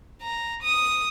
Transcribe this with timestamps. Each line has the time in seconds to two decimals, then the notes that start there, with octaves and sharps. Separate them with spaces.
0.22 A#5
0.63 D#6